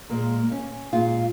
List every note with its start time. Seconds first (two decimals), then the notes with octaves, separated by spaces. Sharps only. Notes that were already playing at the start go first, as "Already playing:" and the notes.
0.10 A#2 G#3 A#3
0.52 C#4
0.93 A#2 G#3 F4